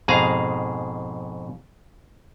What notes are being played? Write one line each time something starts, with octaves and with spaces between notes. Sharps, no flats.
F2 G#2 B2 G#4 F5 A#5